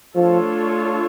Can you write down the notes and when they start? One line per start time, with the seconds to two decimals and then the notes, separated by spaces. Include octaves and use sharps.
0.16 F3 A3 D4 F4 A4 C#5